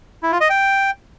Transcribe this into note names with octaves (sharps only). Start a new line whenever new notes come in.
E4
F4
D#5
G5